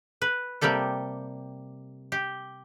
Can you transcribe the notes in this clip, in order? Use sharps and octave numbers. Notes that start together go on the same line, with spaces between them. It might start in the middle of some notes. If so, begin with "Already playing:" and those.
B4
C3 G3 A#3 G4 A4
G4